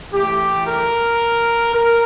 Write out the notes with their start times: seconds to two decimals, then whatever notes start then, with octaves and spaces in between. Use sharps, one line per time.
0.12 A2 E3 A3 G4
0.65 A#4
1.73 A#4